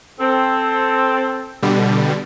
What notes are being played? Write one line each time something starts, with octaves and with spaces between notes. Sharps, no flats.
C4 A4
B2 D3 G3